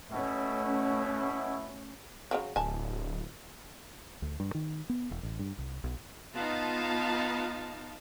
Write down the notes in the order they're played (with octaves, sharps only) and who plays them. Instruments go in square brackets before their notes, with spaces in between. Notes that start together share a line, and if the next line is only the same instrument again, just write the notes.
[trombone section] B2 E4 [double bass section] A3 C#4
[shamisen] C#3 E3 F#3
[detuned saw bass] D1 [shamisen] G#5 A5
[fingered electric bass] D2
G2
D#3
B3
E1
A1
G2
C2
B1
[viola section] B3 D#4 F4 F5 A5